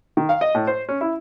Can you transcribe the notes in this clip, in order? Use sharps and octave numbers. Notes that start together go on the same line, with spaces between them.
D#3
F5
D#5
A2
C5
C#4
E4